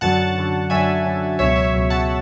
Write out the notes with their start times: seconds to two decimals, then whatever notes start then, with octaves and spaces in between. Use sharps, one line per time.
0.01 F#2 D3 F#3 F#5 A5
0.35 F#2 D3 F#3
0.70 F#2 D3 F#3 E5 G#5
1.04 F#2 D3 F#3
1.38 C#2 B2 F#3 C#5 E5
1.56 C#5 E5
1.73 C#2 B2 F#3
1.90 F#5 A5